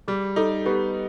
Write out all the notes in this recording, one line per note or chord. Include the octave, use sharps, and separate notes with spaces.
G3 G#4
D#4 A4
B3 G4